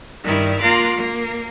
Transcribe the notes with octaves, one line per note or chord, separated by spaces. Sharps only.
G2 D#3 G3 E4
A#3 F4 A#5 C6 D6 F#6
A#3